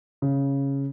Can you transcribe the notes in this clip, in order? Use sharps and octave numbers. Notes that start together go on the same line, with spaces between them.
C#3